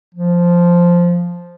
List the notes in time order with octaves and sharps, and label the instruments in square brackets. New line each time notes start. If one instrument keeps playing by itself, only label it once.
[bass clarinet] F3